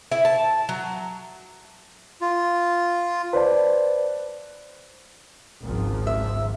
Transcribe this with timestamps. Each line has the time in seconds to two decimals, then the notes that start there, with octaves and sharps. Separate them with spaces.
0.12 E4
0.25 A5
0.69 F#3
2.21 F4
3.33 B4 C5 D5 A5
5.63 G#1 C#2 F3
6.07 E5